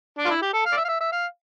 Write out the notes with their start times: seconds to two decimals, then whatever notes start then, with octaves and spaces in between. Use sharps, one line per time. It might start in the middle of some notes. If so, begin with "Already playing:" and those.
0.19 D4
0.25 F4
0.30 E4
0.42 G4
0.53 A4
0.65 F5
0.72 D5
0.77 E5
0.85 F5
0.88 E5
1.01 E5
1.12 F5